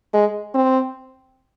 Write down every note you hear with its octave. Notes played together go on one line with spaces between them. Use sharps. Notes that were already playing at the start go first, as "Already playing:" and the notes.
G#3
C4